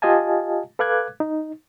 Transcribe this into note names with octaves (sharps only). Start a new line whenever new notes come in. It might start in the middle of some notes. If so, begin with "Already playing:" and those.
F4 G4 D#5 F5 G#5 A5
A4 B4 F5 D6 F#6 G#6
D#4